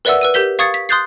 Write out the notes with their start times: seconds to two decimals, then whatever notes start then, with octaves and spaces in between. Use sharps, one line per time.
0.05 A#4 B4 D5 E5 F#5 E6
0.21 B4 E6 D#7
0.34 G4 A#4 G6 B6 G7
0.59 F5 C#6 D#6 G#6 A6 C#7
0.74 B6
0.89 C6 D#6 F#6 G6 A6 C7